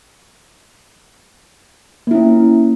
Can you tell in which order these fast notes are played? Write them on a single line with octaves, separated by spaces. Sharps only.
A#3 E4 C#4